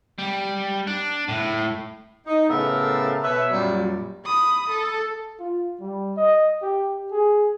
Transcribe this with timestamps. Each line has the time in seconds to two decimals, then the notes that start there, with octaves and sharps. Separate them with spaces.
0.18 G3
0.87 D4
1.29 A2
2.26 D#4
2.49 A2 C#3 B3 A4 A#4 E5
3.24 B2 B4 C#5 E5
3.50 F#2 A#2 F#3 G3
4.26 B5 D#6
4.70 A4
5.40 F4
5.81 G3
6.17 D#5
6.62 G4
7.11 G#4